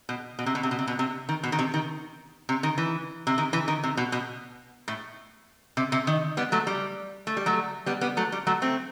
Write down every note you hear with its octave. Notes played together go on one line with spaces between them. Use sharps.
B2
B2
C3
B2
C3
B2
C3
B2
C3
D#3
B2
D#3
C3
D#3
C3
D#3
E3
C3
D#3
E3
D#3
C3
B2
B2
A2
C3
C3
D#3
G3 B3
F#3 A3
G3
A3
G3
F#3 A3
G3 B3
G3 B3
F#3 A3
G3
F#3 A3
A3 C4